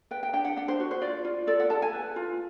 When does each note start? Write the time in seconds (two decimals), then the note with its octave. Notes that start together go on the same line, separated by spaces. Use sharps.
0.11 B4 G5
0.23 G5
0.33 D4 G5
0.45 F#5
0.57 D4 F#5
0.68 C5
0.80 F#4
0.91 C5
1.02 F4 D5
1.25 F4
1.47 A4 D5
1.60 F#5
1.70 A4 A5
1.82 G#5
1.93 B4
2.16 F4